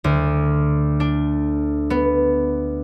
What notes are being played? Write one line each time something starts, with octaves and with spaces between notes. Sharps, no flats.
D2
D4
B3